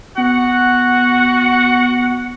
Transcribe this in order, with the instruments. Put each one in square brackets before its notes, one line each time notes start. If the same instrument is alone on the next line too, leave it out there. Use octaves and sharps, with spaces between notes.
[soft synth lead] B3 [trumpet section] F#4 F#5